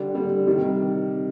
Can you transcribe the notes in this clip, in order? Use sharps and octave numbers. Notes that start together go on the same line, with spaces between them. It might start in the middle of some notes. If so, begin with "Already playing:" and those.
Already playing: D3 G3 D4
D3 G3 D4
C3 D#3 G3